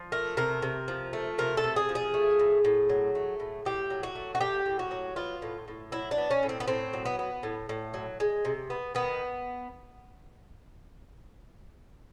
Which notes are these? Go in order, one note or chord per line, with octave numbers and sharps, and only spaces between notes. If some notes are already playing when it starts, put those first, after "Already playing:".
Already playing: F3
A3 A#4
C3 A#4
C3
F3
A3
C3 A#4
A4
C3
G#4
F3
G#4
A3
A2
A2
F#3
A3
A2
A2 G4
F#3
F#4
A3
F#4
A2 G4
A2
F#4
F#3
B3 F4
A2
A2
F#3 E4
D4
B3
C#4
A2
C4
B3
A2 C4
F#3
B3
B3
A2
A2
F#3
G#3
C3
B3
D#3 B3